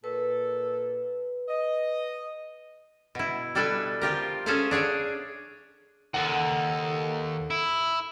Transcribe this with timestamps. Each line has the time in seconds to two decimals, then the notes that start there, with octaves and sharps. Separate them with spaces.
0.04 A#2 A4 B4
1.49 D#5
3.15 B2 E4
3.55 G3 D4 A4 B4 G#5
4.01 F3 F4 G4 A#4
4.46 C#4 G#4 A4 C5 E5 F5
4.71 D4 G#4 C#5 D5
6.14 D#2 A4 F#5
7.51 E4